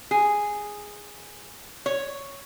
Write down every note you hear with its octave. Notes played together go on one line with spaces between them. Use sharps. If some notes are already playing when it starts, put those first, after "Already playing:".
G#4
C#5